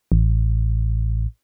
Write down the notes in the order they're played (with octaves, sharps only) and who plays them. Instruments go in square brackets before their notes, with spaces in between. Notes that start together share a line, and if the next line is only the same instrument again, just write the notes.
[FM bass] A1